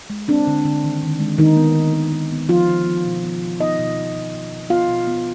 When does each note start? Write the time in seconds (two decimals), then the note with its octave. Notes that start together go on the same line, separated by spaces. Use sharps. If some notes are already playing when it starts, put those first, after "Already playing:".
0.10 G#3
0.28 C4 D4
0.47 D3
0.65 D3
0.84 D#3
1.03 D#3
1.20 G#3
1.38 D#3 D#4
1.57 B3
1.76 B3
1.94 D#3
2.12 D#3
2.31 B3
2.49 D#3 F3 F4
2.68 D#3
2.86 B3
3.05 B2
3.23 B3
3.42 B2
3.59 B3 D#4 D#5
3.79 B2
3.96 B3
4.15 B2
4.34 B2
4.52 B2
4.70 B3 F4 F5
4.88 B2
5.07 B3